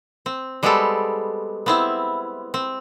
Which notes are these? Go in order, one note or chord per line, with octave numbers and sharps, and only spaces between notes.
C4
G3 G#3 B3 C4 G4 A4
B3 C4 E4
C4